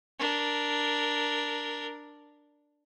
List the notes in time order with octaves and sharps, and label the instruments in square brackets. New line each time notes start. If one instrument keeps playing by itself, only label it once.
[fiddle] D4 A#4